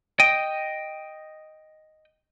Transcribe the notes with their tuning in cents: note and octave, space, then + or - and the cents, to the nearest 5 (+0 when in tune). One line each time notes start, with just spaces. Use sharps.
D#5 +0 G5 +0